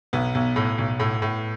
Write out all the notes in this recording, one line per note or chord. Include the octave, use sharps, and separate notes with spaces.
B1 B3
B1
A2
B1
A2
A2